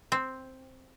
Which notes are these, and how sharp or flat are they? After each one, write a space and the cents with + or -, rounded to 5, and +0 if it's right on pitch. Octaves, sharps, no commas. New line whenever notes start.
C4 +0